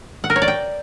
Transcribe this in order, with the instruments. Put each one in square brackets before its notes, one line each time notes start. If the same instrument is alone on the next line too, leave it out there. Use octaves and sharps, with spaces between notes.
[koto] F#5
A#4
C#5
D5
G5